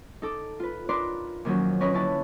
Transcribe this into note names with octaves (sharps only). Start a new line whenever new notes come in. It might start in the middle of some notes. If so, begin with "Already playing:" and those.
D#4 A4 D6
F4 B4
D4 D#4 A#4 B4 D5 C6
A#2 D#3 F3 F#3 C#4
C#4 A#4 B4 C#5 D#5 B5
D3 C#4 E4 A5